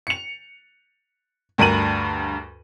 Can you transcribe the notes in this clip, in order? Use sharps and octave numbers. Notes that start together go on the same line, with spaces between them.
C#7 F7
D2 G2 A#4 D#7 F#7